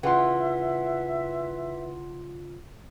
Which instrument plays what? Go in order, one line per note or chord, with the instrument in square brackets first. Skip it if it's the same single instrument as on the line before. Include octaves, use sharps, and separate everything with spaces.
[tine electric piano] C#3 F4 [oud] E3 [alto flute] E5 [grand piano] F#5 C6